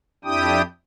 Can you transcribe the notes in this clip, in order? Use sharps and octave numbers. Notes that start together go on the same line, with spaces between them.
F2 D4 E4 G4 G5 D#6